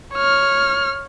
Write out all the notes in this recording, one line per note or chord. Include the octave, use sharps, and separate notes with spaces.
C#5 F6